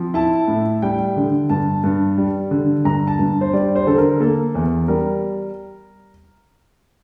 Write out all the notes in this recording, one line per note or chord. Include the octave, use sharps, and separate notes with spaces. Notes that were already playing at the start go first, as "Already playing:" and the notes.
Already playing: F3 C4
E4 A5
A2
G3 G5
D3
G2 A5
G2
G3
D3
G2 A#5
A5
G2
C5
G3 D5
C5
D3 A4
A#4
A#3 A4
E2
G3 A#4